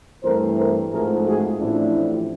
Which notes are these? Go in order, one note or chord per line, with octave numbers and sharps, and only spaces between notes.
G2 E3 A3 C4 A#4 C5
A#4 C5
G#2 F3 A3 C4 G#4 A#4
F#4 G#4
A1 A2 F3 A3 C4 D4 E4